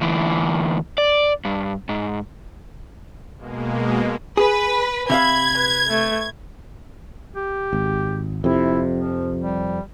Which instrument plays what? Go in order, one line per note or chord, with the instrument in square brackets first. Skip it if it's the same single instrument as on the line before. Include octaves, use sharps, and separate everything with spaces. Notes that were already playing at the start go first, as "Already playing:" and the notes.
[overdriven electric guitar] D2 E3
D5
G2
G#2
[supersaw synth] B2 G#3 A#3
[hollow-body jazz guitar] G#4 [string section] B4
[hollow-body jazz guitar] C3 E5 F5 [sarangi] B5 [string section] G#6
[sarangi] B4
A3
[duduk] G4
[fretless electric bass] G#1
[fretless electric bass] F2 C3 [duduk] E4
[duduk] F3
G3